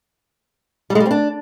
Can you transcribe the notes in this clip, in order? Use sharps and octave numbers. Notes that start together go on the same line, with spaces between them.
G3
G#3
G3
C4
D4